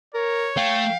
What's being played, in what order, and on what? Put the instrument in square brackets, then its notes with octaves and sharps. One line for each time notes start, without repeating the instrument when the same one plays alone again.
[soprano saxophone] A#4 [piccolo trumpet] C#5
[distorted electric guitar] A3 [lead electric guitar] F5 [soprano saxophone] G5